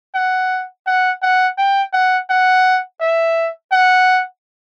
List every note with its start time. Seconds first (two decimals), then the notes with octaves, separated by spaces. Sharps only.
0.15 F#5
0.87 F#5
1.23 F#5
1.58 G5
1.93 F#5
2.30 F#5
3.00 E5
3.72 F#5